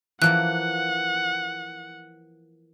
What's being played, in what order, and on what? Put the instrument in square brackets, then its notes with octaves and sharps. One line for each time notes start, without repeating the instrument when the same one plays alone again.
[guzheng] E3 F3 A#3 [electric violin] F#5 [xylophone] F#6